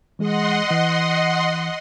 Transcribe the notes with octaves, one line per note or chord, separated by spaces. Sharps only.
E3 G#3 G#4 D#5 F#5 C6
E3